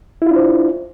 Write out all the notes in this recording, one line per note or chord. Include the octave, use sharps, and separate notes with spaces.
D4 E4 F4 C5